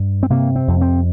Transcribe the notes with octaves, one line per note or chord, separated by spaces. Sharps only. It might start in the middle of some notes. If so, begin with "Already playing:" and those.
Already playing: G2
C4
C3 A#3
C4
F2
C4